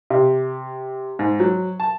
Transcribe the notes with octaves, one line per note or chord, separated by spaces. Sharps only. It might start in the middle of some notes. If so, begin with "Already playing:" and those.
C3
G#2
F#3
A5